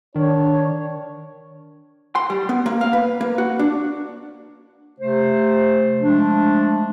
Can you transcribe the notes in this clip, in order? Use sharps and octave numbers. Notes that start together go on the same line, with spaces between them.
D#3 D4 C#5
C6
G3
B3
A#3
F5
B4
A#3
F#4
D4
C3 A3 C5
F3 G#3 A3 D4